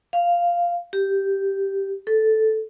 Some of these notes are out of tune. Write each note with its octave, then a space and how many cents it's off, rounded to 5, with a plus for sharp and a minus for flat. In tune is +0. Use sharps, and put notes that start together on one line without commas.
F5 -5
G4 -5
A4 -5